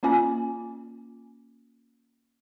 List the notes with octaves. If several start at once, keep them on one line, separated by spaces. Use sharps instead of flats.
A#3 C#4 F4 G#5